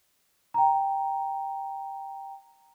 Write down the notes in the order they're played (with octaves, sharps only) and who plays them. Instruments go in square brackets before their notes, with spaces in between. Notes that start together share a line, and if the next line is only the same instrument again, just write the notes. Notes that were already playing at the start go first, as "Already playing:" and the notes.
[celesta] G5 A#5